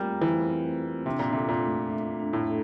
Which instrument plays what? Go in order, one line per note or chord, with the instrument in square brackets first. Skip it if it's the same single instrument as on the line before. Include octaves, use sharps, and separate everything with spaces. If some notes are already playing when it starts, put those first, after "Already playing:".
Already playing: [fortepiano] G3 A#3 [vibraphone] A3 C4 F4
[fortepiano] E3 [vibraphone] C5
[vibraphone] C4
F4
[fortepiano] C3 [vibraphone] D4
[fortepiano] A#2
[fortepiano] C3 [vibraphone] A4
[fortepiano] A#2
[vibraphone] A3
E5
D4
[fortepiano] A2
[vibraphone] A4